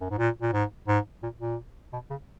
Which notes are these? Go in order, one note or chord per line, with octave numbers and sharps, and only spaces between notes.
F#2
G#2
A#2
A#2
G#2
G#2
A#2
A#2
B2
C#3